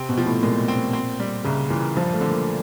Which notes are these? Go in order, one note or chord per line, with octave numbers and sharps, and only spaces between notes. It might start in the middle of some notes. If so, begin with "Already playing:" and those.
Already playing: C3 C4
B2
F3
A2
A#2 G#3
C4
C4
G3
C2 C#3
A#2 E3
G2 F3
A3
D3
A#3